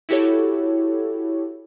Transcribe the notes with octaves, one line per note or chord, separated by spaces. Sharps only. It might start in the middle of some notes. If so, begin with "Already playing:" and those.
E4 F#4 G4 A4 C#5